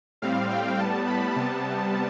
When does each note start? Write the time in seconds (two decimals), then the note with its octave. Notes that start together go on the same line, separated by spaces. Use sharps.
0.22 A2 G3 C4 F5
0.51 G5
0.79 A2 G3 B3 A5
1.07 B5
1.36 C3 G3 B3 A5